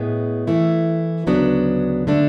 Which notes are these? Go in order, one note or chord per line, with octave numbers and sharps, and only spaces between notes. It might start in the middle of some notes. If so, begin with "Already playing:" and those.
Already playing: A2 G#3 B3
E3 A3 E4
D2 C#3 F#3 B3 D4
D3 A3 D4